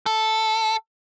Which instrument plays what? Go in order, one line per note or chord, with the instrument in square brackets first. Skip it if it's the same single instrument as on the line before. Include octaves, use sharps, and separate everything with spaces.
[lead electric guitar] A4